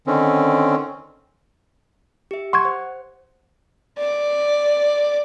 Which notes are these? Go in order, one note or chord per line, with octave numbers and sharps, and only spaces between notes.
D3 D#3 C4 C#4
G4 E5
F#5 C6 C#6 G#6
C5
D5